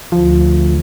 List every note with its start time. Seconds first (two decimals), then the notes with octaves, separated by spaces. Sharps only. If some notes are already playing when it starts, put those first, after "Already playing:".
0.12 D2 F3